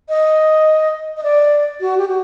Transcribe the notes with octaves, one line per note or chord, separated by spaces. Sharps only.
D#5
D#5
D5
F#4
G4
F#4